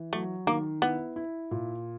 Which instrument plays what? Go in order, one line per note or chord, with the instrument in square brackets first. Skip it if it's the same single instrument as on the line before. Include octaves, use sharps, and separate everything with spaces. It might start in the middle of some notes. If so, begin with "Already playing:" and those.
Already playing: [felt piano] E3
[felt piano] F#3 [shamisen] A3
[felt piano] D#3 [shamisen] A#3
[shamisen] B3 [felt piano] E4
[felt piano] E4
A#2